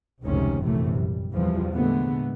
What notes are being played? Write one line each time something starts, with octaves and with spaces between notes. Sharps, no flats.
F1 C#2 G#2 C3 D#3 C#4
A#1 F#2 C3 E3 A3
G3
E2 C3 E3 F3 G3
A#2 D3 G#3 A3 B3